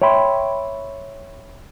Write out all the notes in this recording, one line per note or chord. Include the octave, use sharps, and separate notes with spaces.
C#5 E5 G5 B5 C6